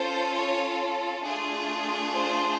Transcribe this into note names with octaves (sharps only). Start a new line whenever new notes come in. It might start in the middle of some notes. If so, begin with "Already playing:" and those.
Already playing: C#4 F4 A4 C5
C#5
A3 D4 F4 G#4
C5